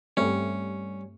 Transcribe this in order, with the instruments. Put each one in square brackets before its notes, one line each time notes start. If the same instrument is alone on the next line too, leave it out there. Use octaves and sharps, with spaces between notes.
[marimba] G2 E5 [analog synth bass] G3 [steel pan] A3 C4 [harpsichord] C#4